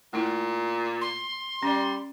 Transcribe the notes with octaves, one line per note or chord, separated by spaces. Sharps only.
A#2 A3 E4
C6
G3 C#4 D5